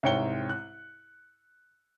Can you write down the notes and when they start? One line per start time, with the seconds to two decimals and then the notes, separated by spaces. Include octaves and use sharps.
0.03 C2 G#2 C#5 G5 C#7 G7
0.49 F#6